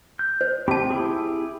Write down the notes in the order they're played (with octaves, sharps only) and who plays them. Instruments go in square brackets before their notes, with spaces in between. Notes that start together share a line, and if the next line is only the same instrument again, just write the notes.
[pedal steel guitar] G6
[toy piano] C5
[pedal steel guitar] C4 G4 [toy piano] A5 B5
[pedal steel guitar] E4 G4 G#4